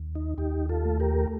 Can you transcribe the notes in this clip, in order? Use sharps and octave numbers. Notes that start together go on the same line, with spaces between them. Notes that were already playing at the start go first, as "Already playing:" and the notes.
Already playing: D#2
D#4
D#2 D#4 G4
F4 A4
A3
G4 A#4